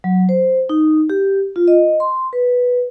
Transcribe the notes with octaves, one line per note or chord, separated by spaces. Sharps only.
F#3
C5
D#4
G4
F4
D#5
C6
B4